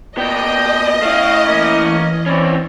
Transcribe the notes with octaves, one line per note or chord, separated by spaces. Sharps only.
A#2 B3 D5 D#5 G5
A3 C#4 E4 F5
E3 A#3 C#4
C4 C#4 E4 C#5 D5